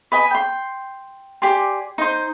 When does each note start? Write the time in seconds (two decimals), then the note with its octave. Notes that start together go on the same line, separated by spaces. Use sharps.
0.12 B4 D#5 G#5 B5
0.31 G5 C6
1.42 G4 D5 G#5 C6
1.98 D#4 C5